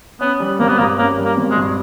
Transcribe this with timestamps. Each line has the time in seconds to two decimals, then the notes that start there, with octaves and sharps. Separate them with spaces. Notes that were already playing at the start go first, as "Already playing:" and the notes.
0.21 B3 C#4
0.40 G3
0.59 G#1 A#3
0.68 B3
0.78 G2 A#3
0.98 A#3 C#4
1.18 G3
1.25 A#3
1.37 G#1
1.50 G#3
1.57 G2